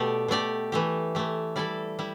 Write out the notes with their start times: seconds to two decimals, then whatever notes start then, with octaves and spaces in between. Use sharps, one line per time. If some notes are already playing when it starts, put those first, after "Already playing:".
Already playing: B2 A3 G4 D5
0.28 B2 A3 G4 D5
0.72 E3 A3 G4
1.15 E3 A3 G4
1.56 G3 E4 A4 D5
1.99 G3 E4